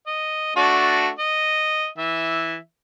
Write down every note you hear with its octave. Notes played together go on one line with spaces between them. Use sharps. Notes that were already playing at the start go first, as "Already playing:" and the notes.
D#5
A3 D4 F#4
D#5
E3 E5